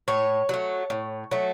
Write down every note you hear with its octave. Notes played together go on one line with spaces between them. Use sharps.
A2 C#5
F#3 A3
A2
F#3 A3